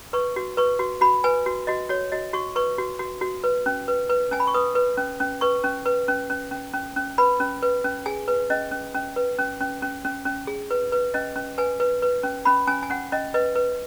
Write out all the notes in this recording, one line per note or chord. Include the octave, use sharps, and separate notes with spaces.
B4 C#6
F#4
B4 C#6
F#4
F#4 B5
B4 G#5
F#4
F#4 D#5
F#4 C#5
F#4 D#5
F#4 C#6
B4 C#6
F#4
F#4
F#4
B4
C#4
B4
B4
C#4 G#5
B5
C#6
B4 D#6
B4
C#4
C#4
B4 C#6
C#4
B4
C#4
C#4
C#4
C#4
C#4
B4 B5
C#4
B4
C#4
G#4 G#5
B4
C#4 D#5
C#4
C#4
B4
C#4
C#4
C#4
C#4
C#4
G#4
B4
B4
C#4 D#5
C#4
B4 G#5
B4
B4
C#4
C#4 B5
C#4 G#5
G#5
C#4 F#5
C#4 D#5
B4 D#5
B4